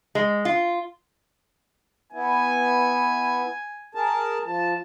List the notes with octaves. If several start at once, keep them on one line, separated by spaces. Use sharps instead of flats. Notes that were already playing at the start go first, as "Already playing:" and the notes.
G#3
F4
B3 E4 G#5
G#4 A#4 A5
F3 A5